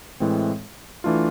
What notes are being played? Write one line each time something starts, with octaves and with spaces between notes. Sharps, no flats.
A2 E3 G#3 C4
E3 A3 D4 F4